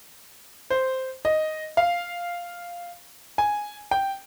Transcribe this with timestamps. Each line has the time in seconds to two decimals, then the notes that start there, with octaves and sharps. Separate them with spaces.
0.70 C5
1.25 D#5
1.77 F5
3.38 G#5
3.91 G5